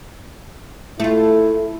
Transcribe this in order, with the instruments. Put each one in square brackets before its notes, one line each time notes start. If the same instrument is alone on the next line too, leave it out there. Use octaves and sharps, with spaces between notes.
[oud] A3 F4 [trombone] E4